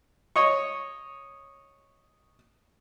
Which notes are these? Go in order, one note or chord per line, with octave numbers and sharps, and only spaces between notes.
C#5 D#5 C#6